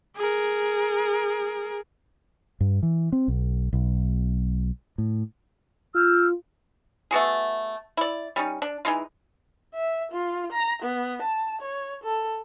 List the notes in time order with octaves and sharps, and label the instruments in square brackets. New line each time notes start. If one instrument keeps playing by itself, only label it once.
[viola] G#4 A#4
[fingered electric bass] G2
E3
C4
B1
B1
A2
[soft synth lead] F4 [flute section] E6 F6 G6
[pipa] A3 B3 F#4 G#4
E4 D5
G3 C#4 D#4
D4
E3 G#3 D#4 F4
[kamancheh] E5
F4
A#5
B3
A5
C#5
A4